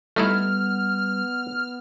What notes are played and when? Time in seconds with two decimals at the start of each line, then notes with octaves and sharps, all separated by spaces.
0.16 G3 A3 B3 D#4 E4 F6